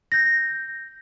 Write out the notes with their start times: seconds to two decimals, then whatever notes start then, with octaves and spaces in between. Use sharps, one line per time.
0.12 G6 A#6